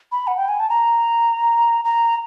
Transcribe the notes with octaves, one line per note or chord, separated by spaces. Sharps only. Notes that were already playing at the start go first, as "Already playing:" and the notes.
B5
F#5
G5
G#5
A5
A#5
A#5